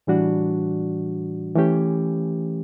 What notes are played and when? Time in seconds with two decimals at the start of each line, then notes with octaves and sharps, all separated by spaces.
0.07 A2 E3 G3 D4 F#4
1.56 E3 A3 C#4 G4